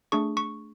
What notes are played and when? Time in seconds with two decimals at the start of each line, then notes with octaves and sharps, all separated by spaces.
0.12 A3 D4 G#4 C#6
0.37 C#6